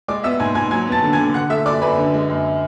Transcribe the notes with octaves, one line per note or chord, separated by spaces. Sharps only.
G#3 D5 D6
B3 E5 E6
G#2 G#5 G#6
G#2 G#5 G#6
F#3 G#5 G#6
B3 A5 A6
D3
G#5 G#6
D3
D3 F#5 F#6
A3 E5 E6
F#2 D5 D6
F#2 B4 B5
D3
G#3
F#2